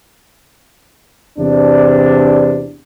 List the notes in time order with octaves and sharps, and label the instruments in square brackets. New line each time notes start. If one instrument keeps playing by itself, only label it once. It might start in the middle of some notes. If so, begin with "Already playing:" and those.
[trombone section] E2 C3 D4